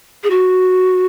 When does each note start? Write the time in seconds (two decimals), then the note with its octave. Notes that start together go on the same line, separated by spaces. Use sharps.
0.23 G#4
0.30 F#4